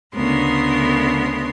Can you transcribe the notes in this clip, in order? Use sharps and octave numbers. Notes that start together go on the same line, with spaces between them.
D2 C#3 B3 A#4 C6